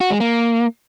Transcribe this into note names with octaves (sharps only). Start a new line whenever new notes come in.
F#4
G#3
A#3